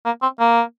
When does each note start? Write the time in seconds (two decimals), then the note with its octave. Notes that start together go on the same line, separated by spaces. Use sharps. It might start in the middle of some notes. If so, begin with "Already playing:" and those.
0.06 A#3
0.22 C4
0.40 A#3